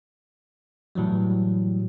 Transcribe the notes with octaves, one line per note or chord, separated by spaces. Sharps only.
A2 E3 F#3 G3